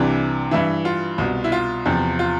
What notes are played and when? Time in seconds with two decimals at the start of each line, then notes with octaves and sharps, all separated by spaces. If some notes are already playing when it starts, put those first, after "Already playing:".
Already playing: C2 C3 E3 D4
0.51 G2 E3 E4
0.85 F4
1.18 C2 B2
1.44 E4
1.52 F4
1.86 E2 C3 F3
2.19 F4